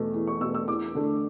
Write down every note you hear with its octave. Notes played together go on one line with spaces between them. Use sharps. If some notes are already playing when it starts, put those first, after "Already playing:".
Already playing: E2 B2 A3
E2
C#6
B2 A3 E6
E6
E2 D6
D3 A3